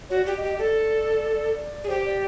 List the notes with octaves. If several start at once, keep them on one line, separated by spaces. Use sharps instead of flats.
F#4 C#5
D5
G4
D#5
G4
D#5
A4 D5
G#4
G4 C5
D5